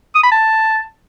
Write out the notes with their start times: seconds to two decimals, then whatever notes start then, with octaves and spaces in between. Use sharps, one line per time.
0.15 D#6
0.24 B5
0.32 A5